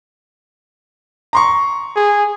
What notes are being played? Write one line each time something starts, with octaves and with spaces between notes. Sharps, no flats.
A#5 C6 C#6
G#4